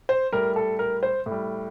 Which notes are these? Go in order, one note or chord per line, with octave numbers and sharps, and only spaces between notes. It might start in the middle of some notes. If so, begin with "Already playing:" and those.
C5
A2 G3 A#4
A4
A#4
C5
A2
G3